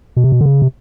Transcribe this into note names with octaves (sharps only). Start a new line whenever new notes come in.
B2
C3
B2
D3
C#3
C3